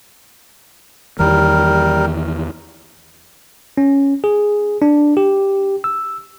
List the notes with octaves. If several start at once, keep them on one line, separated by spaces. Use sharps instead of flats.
E2 D#3 E3 G3 A#4
C#4
G#4
D4
G4
E6